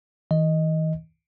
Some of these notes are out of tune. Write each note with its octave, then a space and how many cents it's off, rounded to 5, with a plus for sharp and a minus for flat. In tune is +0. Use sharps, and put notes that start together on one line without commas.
E3 -45 D#5 +0